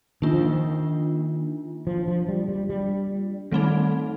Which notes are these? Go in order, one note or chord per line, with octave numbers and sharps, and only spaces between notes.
D#3 A#3 D4 F4
F3
D#3
F3
F3
G3
G3
G3
D#3 G3 A3 C4 D#4